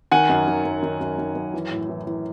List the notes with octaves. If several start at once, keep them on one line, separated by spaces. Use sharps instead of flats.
D#3 F#5 G#5
F#2
D#3
F#2
D#3
F#2
D#3
F#2
E3
A2
E3
E3